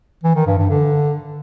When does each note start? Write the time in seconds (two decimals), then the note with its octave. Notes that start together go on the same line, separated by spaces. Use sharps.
0.23 E3
0.35 D#3
0.46 G2
0.58 G2
0.69 D3